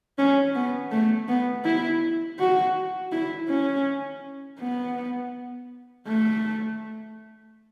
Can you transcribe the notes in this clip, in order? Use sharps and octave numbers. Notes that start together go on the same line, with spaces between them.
C#4
B3
A3
B3
E4
F#4
E4
C#4
B3
A3